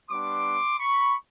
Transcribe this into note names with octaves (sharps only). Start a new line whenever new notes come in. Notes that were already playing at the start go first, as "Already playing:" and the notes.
G3 B3 D4 C6 D6
B5 C#6